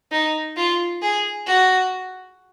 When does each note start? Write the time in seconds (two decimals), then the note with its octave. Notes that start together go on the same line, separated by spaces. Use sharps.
0.12 D#4
0.57 F4
1.02 G#4
1.47 F#4